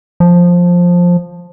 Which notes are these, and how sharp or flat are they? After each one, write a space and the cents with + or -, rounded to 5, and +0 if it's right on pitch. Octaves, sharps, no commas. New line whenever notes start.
F3 +10